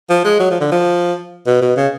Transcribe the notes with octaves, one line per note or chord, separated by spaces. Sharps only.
F3
G#3
F#3
F3
D3
F3
B2
B2
C#3